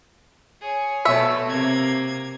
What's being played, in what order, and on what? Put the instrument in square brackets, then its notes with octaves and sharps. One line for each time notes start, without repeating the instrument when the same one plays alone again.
[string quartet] G#4 C#5
[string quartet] B2 A3 [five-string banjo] C#5 E5
[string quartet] C3 A#3 G#6